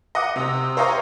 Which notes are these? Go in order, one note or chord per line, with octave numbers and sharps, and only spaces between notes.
D#5 F#5 D6
C3 D#6
C5 C#5 D#5 F5 A#5 C#6